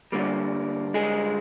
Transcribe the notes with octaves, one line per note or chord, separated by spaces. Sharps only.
G2 D3 G3 A#3
G#3 G#4